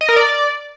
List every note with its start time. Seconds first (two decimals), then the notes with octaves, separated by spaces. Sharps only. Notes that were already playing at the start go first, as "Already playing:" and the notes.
0.01 D#5
0.09 A#4
0.16 D5